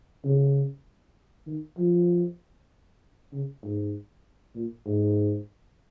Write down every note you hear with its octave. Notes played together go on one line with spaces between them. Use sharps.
C#3
D#3
F3
C#3
G#2
A#2
G#2